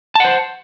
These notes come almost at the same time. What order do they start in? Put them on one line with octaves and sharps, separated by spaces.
A5 F#5 C5